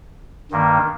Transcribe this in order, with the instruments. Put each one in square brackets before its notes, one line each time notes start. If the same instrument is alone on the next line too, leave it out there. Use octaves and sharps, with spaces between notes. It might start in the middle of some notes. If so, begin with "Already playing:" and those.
[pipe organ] G2 D#3 A#3